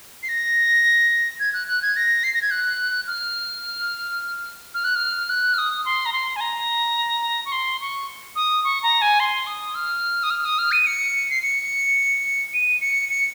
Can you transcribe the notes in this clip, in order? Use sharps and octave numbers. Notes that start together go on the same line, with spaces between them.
C7
A#6
G#6
F#6
F#6
G#6
A#6
C7
A#6
G#6
F#6
F6
F6
F#6
F6
F#6
F6
D#6
C6
A#5
C6
G#5
A#5
C#6
C6
C#6
D#6
C#6
A#5
G#5
C6
D#6
F6
D#6
F6
D#6
F6
D#7
C#7
C7
C#7
D#7
C#7
C#7